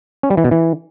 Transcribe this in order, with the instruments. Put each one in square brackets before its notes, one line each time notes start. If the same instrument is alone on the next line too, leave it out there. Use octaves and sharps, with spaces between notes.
[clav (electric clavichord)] C#4
G3
E3
B2
E3